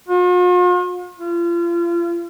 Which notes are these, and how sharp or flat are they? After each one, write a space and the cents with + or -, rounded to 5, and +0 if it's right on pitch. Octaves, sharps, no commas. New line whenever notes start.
F4 +45
F4 -35